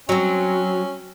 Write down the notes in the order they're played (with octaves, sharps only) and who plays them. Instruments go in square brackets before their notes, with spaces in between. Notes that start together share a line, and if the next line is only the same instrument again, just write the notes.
[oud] F#3 C4 [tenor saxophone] C#4